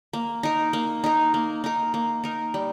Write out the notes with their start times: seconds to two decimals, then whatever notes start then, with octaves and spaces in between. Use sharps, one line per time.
0.13 A#3
0.43 D#4 A#4
0.73 A#3
1.04 D#4 A#4
1.34 A#3
1.64 D#4 A#4
1.94 A#3
2.24 D#4 A#4
2.54 G3